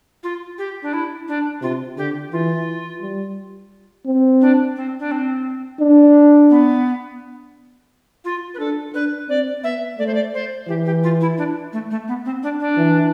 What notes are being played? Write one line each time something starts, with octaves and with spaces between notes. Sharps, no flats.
F4
G4
D4
E4
D4
C3 F4
D3 G4
E3 F4
G3
C4
D4
C4
D4
C4
D4
B3
F4
B4
D4 A4
D4 B4
C4 D5
B3 E5
A3 D5
C5
D5
C5
E3 G4
G4
F4
E4
D4
A3
A3
B3
C4
D4
D4
E3